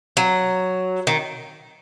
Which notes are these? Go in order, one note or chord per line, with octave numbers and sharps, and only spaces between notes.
F#3
D#3